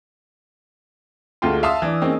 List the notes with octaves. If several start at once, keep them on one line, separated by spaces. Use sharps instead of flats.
D2 G#3 A3 F4 G5 C6
E5 F5 A5 C6 D#6 E6
E3 D4
G#3 A#3 C4 C#4 D#4